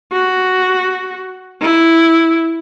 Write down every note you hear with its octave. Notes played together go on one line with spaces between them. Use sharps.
F#4
E4